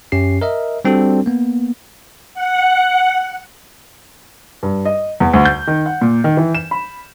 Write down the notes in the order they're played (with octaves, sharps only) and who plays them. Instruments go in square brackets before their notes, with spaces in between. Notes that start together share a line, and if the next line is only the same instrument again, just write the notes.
[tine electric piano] F#2 C#4 G4 C7
A#4 D#5 E5
G3 C4 D4 F#4 A4
A#3 B3
[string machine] F#5
[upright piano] G2
D#5
E2
D2
G6
D#3
F#5
A#2
D#3
E3
E7
B5